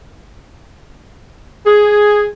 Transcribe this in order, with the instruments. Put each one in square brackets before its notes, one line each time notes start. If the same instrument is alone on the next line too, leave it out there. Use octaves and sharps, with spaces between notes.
[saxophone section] G#4